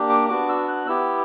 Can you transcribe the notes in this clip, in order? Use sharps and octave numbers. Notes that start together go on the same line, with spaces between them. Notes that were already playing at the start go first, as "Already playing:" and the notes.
Already playing: A#3 D4 G4
D6
B3 D4 F#4 D6
E6
F#6
B3 E4 G4 E6